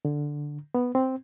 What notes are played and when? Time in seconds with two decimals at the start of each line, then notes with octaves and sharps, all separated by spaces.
0.05 D3
0.75 B3
0.95 C4